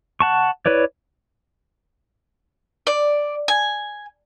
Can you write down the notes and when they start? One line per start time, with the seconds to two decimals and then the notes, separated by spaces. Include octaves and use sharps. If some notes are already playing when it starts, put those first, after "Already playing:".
0.20 F#5 A5 C#6
0.66 E4 B4 C#5 D5
2.87 D5
3.48 G#5